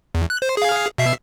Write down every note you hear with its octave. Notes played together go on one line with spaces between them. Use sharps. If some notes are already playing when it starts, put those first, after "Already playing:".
E2
F#6
C5
G#4 F5
B2 E5 C7